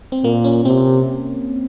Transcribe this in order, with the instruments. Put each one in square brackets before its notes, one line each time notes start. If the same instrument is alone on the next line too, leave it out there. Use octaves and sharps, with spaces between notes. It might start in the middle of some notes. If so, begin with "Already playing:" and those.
[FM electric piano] C4
[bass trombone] A#2 [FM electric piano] A#3
[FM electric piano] C#4
[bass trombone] C3 [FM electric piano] C4